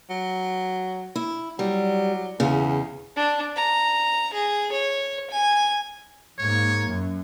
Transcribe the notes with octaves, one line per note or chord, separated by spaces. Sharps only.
F#3
E4
F#3 G3
E2 C#3
D4
A#5
G#4
C#5
G#5
G#2 A#3 C#5
F#2